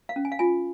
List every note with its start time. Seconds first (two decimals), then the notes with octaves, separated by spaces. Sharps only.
0.09 F5
0.16 C#4
0.25 G#5
0.32 F5
0.39 F4 G#5